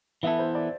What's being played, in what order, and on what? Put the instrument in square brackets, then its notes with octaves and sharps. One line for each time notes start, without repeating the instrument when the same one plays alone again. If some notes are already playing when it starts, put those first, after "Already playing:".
[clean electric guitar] E3 B3 E4 A4 [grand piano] E5
[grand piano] C5
D5